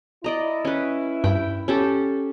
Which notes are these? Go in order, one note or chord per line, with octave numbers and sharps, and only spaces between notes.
E4 D5 D#5 A#5
C#4 B4
G2 G5 B5
C#4 G4 A4